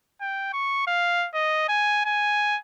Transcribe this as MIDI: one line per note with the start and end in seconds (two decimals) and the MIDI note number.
0.21 0.49 79
0.53 0.87 85
0.87 1.27 77
1.34 1.67 75
1.69 2.03 80
2.05 2.57 80